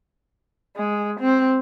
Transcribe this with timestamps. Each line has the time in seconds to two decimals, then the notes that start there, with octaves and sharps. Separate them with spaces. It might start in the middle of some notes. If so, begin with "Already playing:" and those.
0.77 G#3
1.20 C4